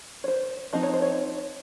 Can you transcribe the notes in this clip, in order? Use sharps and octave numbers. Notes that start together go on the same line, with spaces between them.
C#5
C5
F3 C4 D#4 D#5
C#5
C5
C#5